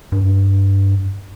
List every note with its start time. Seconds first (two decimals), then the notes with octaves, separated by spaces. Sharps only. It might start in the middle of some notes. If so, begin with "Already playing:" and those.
0.12 G2